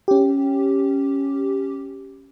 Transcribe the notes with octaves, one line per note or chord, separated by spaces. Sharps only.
C#4 G4